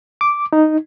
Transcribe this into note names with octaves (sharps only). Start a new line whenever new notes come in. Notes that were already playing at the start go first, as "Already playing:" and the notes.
D6
D#4